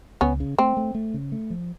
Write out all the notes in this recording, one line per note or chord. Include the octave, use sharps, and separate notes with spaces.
C#2 B3 C#4
C#3
A3 C4
A3
A3
C#3
A3
F3